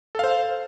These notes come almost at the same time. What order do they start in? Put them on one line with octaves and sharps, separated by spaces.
A4 F5 C5